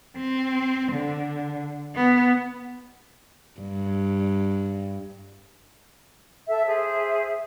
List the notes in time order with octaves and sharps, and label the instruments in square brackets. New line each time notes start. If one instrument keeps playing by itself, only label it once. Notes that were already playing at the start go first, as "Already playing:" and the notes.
[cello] C4
D3
B3
[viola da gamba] G2
[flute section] A4 E5
G#4 C5 E5